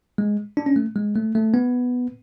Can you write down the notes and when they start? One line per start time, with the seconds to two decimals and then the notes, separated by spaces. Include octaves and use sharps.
0.18 G#3
0.57 D4
0.66 C#4
0.76 A3
0.96 G#3
1.16 A3
1.35 A3
1.54 B3